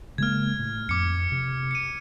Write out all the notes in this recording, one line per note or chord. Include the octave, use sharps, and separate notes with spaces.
C#3 G#3 A#3 F6 G#6
A2
F2 D6 C#7
C3
C#7 D#7